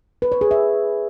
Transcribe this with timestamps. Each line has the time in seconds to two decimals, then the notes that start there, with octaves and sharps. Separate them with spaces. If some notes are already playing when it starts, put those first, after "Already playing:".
0.22 B4
0.32 C#5
0.41 G#4
0.51 E5